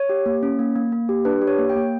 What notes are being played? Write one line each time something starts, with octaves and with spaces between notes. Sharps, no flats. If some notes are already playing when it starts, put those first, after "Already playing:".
Already playing: C#5
G4
A#3
C#4
A#3
A#3
A#3
G4
D4 B4
G4
C#5
A#3
G5
A#3